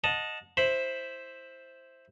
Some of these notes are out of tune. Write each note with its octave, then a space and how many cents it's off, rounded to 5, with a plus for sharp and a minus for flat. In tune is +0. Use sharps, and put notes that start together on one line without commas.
D#5 +0 F#5 -30 A5 +0
E4 +0 C5 +5 B5 +0